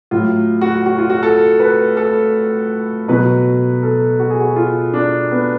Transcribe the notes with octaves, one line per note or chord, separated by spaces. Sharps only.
A2 F#3 F4
F#4
F#4
F4
F#4
A4
B4
A4
B2 F#3 B4
A4
F#4
G#4
F#4
F4
D4
B3